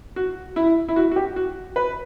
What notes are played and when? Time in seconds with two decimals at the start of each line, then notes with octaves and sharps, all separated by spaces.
0.16 F#4
0.56 E4
0.88 E4
0.96 F#4
1.12 F#4
1.16 G4
1.36 F#4
1.76 B4